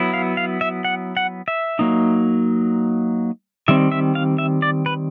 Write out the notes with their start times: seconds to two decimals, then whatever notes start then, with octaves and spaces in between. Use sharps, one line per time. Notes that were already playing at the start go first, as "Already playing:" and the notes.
Already playing: F#3 B3 E4
0.14 F5
0.37 F5
0.61 E5
0.84 F#5
1.17 F#5
1.48 E5
1.79 F#3 A#3 D#4
3.68 D#3 G3 C4 E5
3.92 E5
4.15 F5
4.38 E5
4.62 D5
4.86 B4